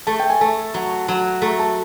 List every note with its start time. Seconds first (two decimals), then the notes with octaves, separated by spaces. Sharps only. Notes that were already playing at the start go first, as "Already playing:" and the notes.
0.07 A3 A5
0.20 G5
0.30 G#5
0.41 A3 A5
0.74 F#3
1.08 F#3
1.42 A3 A#5
1.60 A5